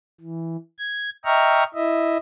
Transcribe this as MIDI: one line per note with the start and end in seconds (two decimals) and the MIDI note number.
0.21 0.57 52
0.78 1.10 92
1.25 1.64 75
1.25 1.64 76
1.25 1.64 79
1.25 1.64 82
1.25 1.64 85
1.25 1.64 89
1.75 2.17 64
1.75 2.17 75
1.75 2.17 76